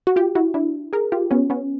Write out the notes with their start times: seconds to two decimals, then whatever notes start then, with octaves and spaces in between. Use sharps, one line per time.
0.07 F#4
0.16 F4 G4
0.35 E4 F#4
0.54 D4 E4
0.93 G#4 A#4
1.12 F4 G4
1.31 B3 C#4
1.50 B3 C#4